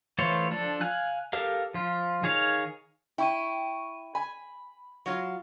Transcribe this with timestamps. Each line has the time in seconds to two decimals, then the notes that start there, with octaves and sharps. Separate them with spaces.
0.18 E3 A3 F4 C5 C#5
0.51 F3 D4 A4
0.81 F5 G#5 F#6
1.33 G4 A4 A#4 F5
1.74 F3 F4
2.23 D#3 G#4 C#5 F5
3.18 E4 G5 C#6 D#7
4.15 G#5 B5
5.06 F#3 F4